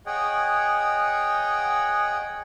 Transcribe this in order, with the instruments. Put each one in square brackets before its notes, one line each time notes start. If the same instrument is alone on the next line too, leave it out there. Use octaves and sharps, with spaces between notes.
[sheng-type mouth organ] G#4 C#5 D#5 F#5 G5